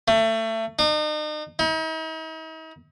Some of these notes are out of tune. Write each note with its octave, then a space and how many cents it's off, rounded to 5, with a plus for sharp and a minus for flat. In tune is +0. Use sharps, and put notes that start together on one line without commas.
A3 +25
D#4 -40
D#4 +45